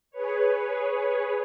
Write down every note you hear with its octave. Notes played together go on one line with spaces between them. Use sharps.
G#4 B4 C#5